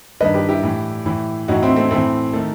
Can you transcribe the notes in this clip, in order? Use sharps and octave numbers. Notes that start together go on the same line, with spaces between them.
G2 D#3 B4 D#5
G4 B4
E4 G4
A2 E3
A2 E3
A2 E3 D#4 F#4
C4 E4
A3 C4
A2 E3 A3 C4
D#3 A3